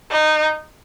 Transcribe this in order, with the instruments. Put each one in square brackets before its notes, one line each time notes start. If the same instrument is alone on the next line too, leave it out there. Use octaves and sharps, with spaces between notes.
[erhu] D#4